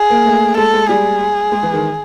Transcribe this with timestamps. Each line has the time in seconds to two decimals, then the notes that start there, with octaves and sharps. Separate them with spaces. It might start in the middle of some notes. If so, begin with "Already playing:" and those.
Already playing: G#4
0.10 A#3
0.26 A3
0.57 G#3 A4
0.74 G#3
0.89 G3 G#4
1.52 G#3
1.63 E3
1.74 D#3